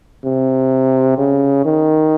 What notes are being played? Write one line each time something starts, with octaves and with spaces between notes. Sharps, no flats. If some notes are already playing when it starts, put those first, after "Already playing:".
C3
C#3
D#3